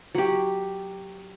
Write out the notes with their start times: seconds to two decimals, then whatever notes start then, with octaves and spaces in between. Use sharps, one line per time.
0.15 F#3 G4